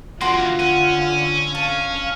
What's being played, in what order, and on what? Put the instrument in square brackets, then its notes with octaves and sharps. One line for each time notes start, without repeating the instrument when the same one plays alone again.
[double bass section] D3 [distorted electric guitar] E3 A#3 [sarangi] F4 [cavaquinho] F#4 C6
[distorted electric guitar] C#4 [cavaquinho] F#5
[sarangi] F5 [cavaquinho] A5